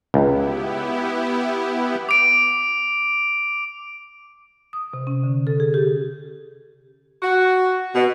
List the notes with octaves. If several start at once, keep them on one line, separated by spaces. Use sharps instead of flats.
C#2 B3 E4 G4
D6 D7
D#6
C3
C#4
D3
A4
G#4
G4
F#4
B2